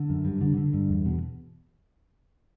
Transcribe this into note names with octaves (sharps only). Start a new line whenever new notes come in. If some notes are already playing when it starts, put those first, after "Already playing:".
Already playing: D3
F#2
G2
D3
D3
G2
E2
B2